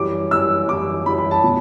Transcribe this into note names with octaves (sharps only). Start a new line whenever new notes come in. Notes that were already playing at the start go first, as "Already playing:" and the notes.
Already playing: F#2 E3 G3 D6
F#2 E3 G3 E6
F#2 E3 G3 D6
F#2 E3 G3 B5
B5
A5
B2